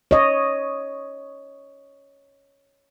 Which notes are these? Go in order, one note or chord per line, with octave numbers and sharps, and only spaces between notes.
C#5 D#5